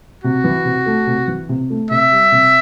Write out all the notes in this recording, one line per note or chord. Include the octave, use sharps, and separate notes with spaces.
C3 F#4
E3
C3
A3
C3
E3
C3
A3
C3 E5
G3
C3